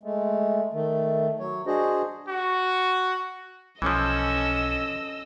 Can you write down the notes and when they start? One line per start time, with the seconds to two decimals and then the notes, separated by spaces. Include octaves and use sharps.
0.03 G#3 A3
0.73 D#3 A3
1.39 F#3 C#5
1.67 D4 F#4 G#4 C5 D#5
2.28 F#4
3.82 B1 E3 F3 C#4 A4 D#5 E6